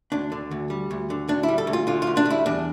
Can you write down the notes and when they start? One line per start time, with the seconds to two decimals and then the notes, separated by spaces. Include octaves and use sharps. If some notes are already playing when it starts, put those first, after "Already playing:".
0.12 D2 D4
0.32 D3
0.51 D2
0.70 G3
0.91 D2
1.10 D3
1.28 D2 D4
1.43 E4
1.48 G3
1.58 A4
1.67 D2
1.73 F4
1.87 D3 F4
2.02 F4
2.07 D2
2.17 D4
2.26 G3 E4
2.46 E2 D4